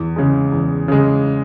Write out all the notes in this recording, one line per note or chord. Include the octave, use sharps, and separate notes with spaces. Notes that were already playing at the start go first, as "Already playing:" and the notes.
Already playing: E2
C#3 G#3
E2
C#3 G#3